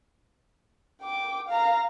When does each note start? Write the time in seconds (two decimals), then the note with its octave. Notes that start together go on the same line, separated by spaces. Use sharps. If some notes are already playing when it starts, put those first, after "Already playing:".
1.02 G5 D6
1.48 F5 A#5